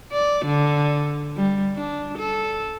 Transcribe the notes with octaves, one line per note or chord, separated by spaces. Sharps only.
D5
D3
G3
D4
A4